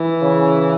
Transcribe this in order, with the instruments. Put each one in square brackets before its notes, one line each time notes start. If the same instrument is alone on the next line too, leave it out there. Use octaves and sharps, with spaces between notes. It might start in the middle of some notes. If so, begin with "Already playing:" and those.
Already playing: [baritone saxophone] E3
[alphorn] C#3